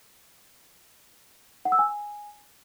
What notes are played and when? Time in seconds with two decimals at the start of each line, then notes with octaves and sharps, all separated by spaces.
1.65 F#5
1.72 E6
1.79 G#5